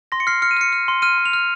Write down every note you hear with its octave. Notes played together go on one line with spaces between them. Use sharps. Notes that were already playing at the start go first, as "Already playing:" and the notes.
C6 A#6
C#7
F6 C7
F6 C#7
D#7
F6 C#7
F6
C6
F6 D#7
C6
F7
F6